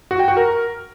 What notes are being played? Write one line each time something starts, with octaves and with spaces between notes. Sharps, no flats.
F#4
G5
F#4
A#4